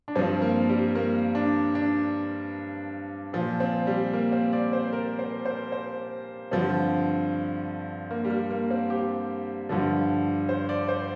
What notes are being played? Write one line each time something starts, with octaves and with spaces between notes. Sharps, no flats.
D4
G2 F3 C4
A#3
G3
A#3
D4
D4
A#2 F3
C4
G3
A#3
C4
D5
C5
A#4
C5
C5
C5
G2 D3 F3 C4
A#3
G3
A#3
A#3
C4
G4
G2 D3 F3
C5
D5
C5